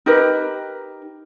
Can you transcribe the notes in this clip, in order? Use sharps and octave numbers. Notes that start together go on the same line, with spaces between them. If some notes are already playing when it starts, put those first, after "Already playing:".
D#4 G4 A#4 B4